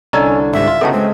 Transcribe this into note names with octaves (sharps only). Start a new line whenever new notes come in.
C2 D3 C#4 A4 D5 D#5 G#5 A#5
G#1 C3 E5
F4
C#3 B3 D#4 F#4 A4 G5 A5
G#3 C4